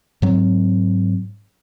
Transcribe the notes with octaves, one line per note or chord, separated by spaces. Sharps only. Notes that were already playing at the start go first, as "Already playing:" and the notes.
G#2 F#3 C4